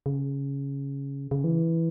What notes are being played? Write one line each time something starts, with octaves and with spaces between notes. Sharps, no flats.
C#3
C#3
E3